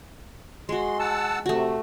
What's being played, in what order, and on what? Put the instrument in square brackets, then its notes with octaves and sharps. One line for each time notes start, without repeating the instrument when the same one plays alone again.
[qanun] G#3 F#4 [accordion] C6
[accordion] F#5 A5 E6
[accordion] C3 [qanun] A3 F#4